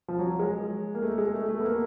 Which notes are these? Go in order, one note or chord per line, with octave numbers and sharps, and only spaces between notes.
F3
F#3
G#3
A#3
A3
G#3
A3
A3
B3
A#3